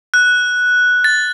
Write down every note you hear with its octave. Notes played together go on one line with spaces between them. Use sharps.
F#6
A6